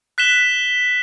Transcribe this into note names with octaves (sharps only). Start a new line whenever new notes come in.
F#6 B6 E7 G7